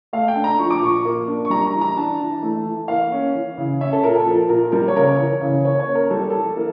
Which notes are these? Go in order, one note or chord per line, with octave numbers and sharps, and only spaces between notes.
A3 F5
G5
D4
A#5
F3 C#6
D6
A#2 C#6
A#3
D4
C#6
G3 A#5
A#5
E3
A#5
D4 A5
E3
A3
E3
A#3 F5
C#4
E3
C#3
C#4 E5
A4
A#2 A#4
A4
F3
A#2 A#4
G3 A#4
C#5
C#3 A#4
C#5
E3
C#3
A#3 C#5
C#5
C#4
A#4
G3 A4
E3 A4
A#3